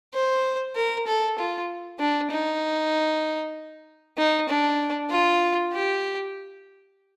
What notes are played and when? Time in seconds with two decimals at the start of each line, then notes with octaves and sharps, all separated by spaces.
0.14 C5
0.76 A#4
1.07 A4
1.38 F4
2.00 D4
2.31 D#4
4.18 D#4
4.48 D4
5.10 F4
5.73 G4